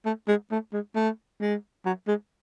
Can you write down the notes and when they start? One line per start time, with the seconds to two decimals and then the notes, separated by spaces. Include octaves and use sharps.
0.06 A3
0.28 G#3
0.51 A3
0.73 G#3
0.95 A3
1.41 G#3
1.86 F#3
2.08 G#3